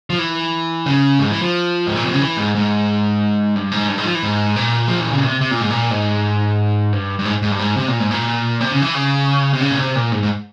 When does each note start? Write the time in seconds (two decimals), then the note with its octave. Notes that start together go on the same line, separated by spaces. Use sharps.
0.10 F3
0.19 E3
0.86 C#3
1.19 G#2
1.31 E3
1.42 F3
1.87 G#2
1.96 A#2
2.04 C3
2.13 C#3
2.21 E3
2.37 G#2
2.55 G#2
3.56 G2
3.72 G#2
3.88 G2
3.98 G#2
4.05 F3
4.15 E3
4.23 G#2
4.56 A#2
4.88 F3
5.00 E3
5.12 C#3
5.24 C3
5.41 C3
5.51 A#2
5.60 G#2
5.70 A#2
5.91 G#2
6.93 G2
7.19 G2
7.25 G#2
7.42 G#2
7.51 G2
7.59 G#2
7.77 C3
7.88 A#2
8.00 G#2
8.11 A#2
8.61 C3
8.72 C#3
8.82 E3
8.94 C#3
9.53 C3
9.61 C#3
9.71 A#2
9.77 C3
9.95 A#2
10.12 G#2
10.23 G#2